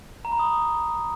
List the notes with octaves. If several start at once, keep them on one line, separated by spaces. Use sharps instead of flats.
A#5
B5
D#6